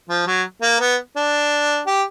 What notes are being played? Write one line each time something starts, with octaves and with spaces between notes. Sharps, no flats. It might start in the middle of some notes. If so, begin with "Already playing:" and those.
F3
F#3
A#3
B3
D4
G4